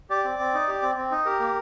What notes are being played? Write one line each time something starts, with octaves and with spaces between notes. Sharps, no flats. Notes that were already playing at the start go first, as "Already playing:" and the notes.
G4 D5
C4
C4
D#4
G4
C4
C4
D#4
G4 A#4
A#3